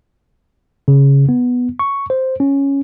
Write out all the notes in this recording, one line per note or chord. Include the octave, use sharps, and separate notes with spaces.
C#3
B3
C#6
C5
C#4